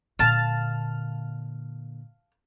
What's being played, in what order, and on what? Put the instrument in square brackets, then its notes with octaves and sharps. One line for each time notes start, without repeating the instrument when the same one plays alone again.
[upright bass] A#2 D3 [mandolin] F5 A5